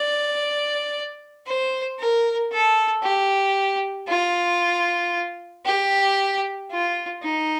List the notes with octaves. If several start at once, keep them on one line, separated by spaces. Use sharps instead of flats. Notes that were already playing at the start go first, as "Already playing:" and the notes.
Already playing: D5
C5
A#4
A4
G4
F4
G4
F4
D#4